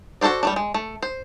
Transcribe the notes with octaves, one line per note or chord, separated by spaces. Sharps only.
F#4 A4 A#4 C5 D5
G3 A3 D4
G#3
A3
C5